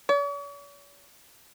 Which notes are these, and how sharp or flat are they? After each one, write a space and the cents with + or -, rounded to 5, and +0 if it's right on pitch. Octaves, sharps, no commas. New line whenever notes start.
C#5 +45